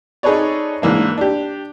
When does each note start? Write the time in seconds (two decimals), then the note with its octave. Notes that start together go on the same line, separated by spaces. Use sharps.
0.23 D#4 G#4 A4 B4 C#5 D5
0.82 G#2 E3 A#3 D4
1.18 D4 G4